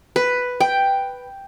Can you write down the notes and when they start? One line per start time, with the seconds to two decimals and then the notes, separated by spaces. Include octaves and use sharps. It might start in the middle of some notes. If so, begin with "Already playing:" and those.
0.16 B4
0.60 G5